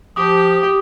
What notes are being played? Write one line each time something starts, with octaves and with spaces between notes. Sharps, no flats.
F3 G4 D6 D#6